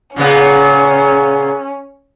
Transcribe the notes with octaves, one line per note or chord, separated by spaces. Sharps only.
A#2 C#3 B3 C#4